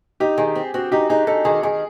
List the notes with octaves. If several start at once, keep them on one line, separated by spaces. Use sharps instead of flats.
D#4 G4
D#3 G#4
C4
C4 F#4
D#4 G4
D#4 G#4
D#4 A4
D#3 G#4
D#3 G#4